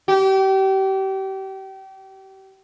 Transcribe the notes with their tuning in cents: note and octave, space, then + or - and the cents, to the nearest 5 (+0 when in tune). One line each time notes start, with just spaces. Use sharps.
G4 -30